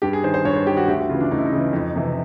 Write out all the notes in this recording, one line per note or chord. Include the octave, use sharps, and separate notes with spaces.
G2 G4
G#4
D#3 C5
C5
G2 C#5
C5
D#3 G4
F#4
D2 G4
F#4
C#3 E3 F4
D4
D2 D#4
E4
D#4
C#3 E3
F2 D#4
C3 E3